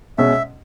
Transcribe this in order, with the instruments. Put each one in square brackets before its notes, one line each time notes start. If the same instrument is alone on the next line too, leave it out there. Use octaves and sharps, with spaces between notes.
[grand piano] B2 G#3 C#4 [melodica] E5